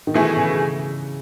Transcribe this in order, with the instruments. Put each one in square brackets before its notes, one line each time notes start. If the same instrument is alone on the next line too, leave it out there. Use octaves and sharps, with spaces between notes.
[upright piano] D#3
[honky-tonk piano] B2 A3 E4 G#4 [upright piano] E3
[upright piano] C#3